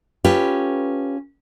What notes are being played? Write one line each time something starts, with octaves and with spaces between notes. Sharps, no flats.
C#4 F4 G4 A4 B4